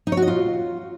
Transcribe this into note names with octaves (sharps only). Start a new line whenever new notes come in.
D#4
C#5
F#4
D#5
F4